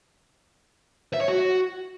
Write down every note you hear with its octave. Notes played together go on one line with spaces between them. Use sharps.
E5
C#5
F#4